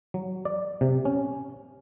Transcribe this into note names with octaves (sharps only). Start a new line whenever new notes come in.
F#3
D5
C3
C#4